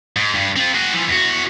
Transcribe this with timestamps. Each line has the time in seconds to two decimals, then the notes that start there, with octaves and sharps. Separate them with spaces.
0.16 G#2
0.35 G2
0.56 C4 F4
0.75 F#4 G#4
0.94 E3 F3
1.09 E2 F#4